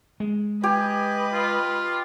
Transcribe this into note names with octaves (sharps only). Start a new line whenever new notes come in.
G#3
G4 B4 D#5 G#5
F4